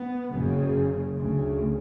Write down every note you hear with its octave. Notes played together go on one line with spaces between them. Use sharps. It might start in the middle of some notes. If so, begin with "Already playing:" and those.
Already playing: B3
F#1 F#2 C#3
D2 C#3